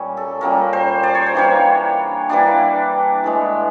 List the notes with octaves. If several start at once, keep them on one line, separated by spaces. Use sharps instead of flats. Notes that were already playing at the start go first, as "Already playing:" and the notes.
Already playing: A#2 G3 A#3 C#4
A4
A#2 G3 A#3 C#4 A#4
C5
D5
C#5
C5
E3 G3 A#3 D4 C#5
E3 G3 A#3 D4 D5
A2 E3 G#3